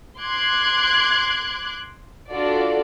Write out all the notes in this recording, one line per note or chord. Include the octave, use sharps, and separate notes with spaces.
C6 D6 F#6 G#6
D4 F4 F#4 A4 D5